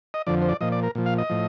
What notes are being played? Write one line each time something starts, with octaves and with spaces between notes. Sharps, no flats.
D#5
F2 D3 F3 D5
C5
D5
A#2 F3 D#5
D5
A#4
A#2 F3
F5
D#5
A2 F3